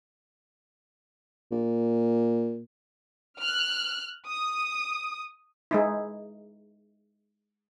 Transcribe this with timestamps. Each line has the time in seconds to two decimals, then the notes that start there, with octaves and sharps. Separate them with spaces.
1.52 A#2
3.40 F6 F#6
4.27 D#6
5.71 G#3 D#4 E4